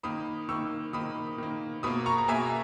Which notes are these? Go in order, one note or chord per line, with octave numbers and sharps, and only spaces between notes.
D#3 A#3 B5 D#6
D#3 A#3 C#6 E6
D#3 A#3 B5 D#6
D#3 A#3
B2 A#3 B5 D#6
A#5 C#6
A#5
B2 A#3 E5 G#5